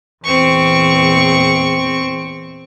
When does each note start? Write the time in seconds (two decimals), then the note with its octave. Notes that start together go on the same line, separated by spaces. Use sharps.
0.25 E2 A#2 C4 C#6